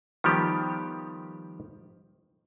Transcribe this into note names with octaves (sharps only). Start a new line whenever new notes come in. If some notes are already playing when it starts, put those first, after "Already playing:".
D#3 F3 G3 B3 G4